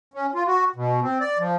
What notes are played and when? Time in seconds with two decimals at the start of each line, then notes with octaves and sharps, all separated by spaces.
0.14 C#4
0.35 F4
0.47 F#4
0.76 B2
1.02 C4
1.20 D5
1.39 F3